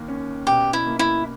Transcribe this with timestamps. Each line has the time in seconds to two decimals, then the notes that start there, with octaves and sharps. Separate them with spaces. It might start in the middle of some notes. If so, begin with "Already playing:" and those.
Already playing: D#2 D#3 A#3
0.08 C#4
0.47 B2 G4
0.73 E4
0.87 A#3
0.99 E4